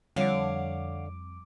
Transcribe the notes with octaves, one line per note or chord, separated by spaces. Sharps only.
F2 D3 G3 C#5 F5 F#5 D6